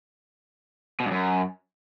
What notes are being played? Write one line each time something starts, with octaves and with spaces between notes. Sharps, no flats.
B2
G2
F#2